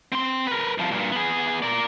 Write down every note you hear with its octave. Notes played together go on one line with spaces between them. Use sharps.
C4 C6
A#4 B4
C2 F3
G2 A#2
B3 G#4
A#4 D5